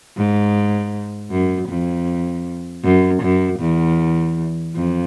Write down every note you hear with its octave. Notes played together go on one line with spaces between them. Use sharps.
G#2
F#2
F2
F#2
F#2
E2
F2